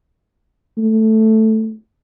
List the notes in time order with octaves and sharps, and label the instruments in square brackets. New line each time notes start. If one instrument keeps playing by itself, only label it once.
[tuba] A3